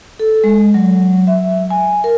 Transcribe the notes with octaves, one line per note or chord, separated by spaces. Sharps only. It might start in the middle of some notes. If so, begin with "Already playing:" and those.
A4
G#3
F#3
E5
G#5
A#4